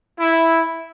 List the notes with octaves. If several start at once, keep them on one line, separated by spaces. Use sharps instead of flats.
E4